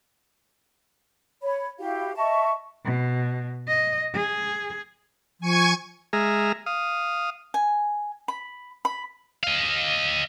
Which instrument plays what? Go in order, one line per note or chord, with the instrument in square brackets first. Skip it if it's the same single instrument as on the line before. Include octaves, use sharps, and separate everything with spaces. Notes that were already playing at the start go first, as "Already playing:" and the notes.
[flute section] C#5 B5
E4 F#4 G4 F5
D#5 E5 A5 C#6
[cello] B2
D#5
G#4
[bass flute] F3 [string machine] G#5 C#6 G#6
[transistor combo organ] G#3 G#4 E5 A#5 F6
F5 D#6
[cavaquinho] G#5
B5
B5
[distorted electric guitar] D#5 F5